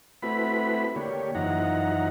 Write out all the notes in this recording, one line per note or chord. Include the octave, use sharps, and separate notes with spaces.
A3 C4 E4 F#4 B4 B5
D3 A#3 G4 C#5
F#2 E3 F3 D#4 F#5 A#5